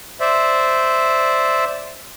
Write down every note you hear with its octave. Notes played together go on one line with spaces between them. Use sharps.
C5 D5 E5